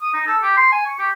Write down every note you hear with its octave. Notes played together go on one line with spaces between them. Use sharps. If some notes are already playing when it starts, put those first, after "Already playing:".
D#6
D#4
A4
G4
C6
G#5
C#6
G4